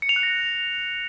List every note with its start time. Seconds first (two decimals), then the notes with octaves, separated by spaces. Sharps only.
0.02 C#7
0.09 F7
0.16 F#6
0.23 A#6